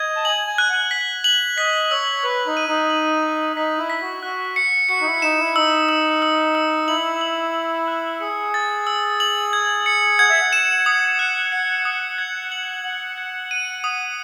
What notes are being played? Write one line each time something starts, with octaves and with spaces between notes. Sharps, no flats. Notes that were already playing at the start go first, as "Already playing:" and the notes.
Already playing: D#5 G#6
A5
G#5 F#7
G#5
F#6
F#5
B6
F#7
D#5 B6
C#5 E6
B4 E6
D#4
D#7
D#4
F#7
D#7
D#4 B6
E4
B6
F#4
F#4 F#6
C#7
F#4 C#7
D#4
E4
D#4 E7
E4
D#4 E6
E6
E6
E6
E4 F#7
F#7
F#7
F#6
G#4 C#7
A6
E6
F#7
G#6
C#7
F#5 G#6
E5
F#5
E7
D#6
F#6
F#5 C#7
D#6
G#6
F#7
F#5 F#7
G#6
D#7
D#6